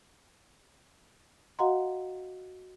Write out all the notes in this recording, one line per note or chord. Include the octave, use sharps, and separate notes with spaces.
F#4 D#5 F5 F#5 A#5 C6